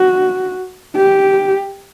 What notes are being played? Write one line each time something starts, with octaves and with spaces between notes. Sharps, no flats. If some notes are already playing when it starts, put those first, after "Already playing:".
Already playing: F#4
G4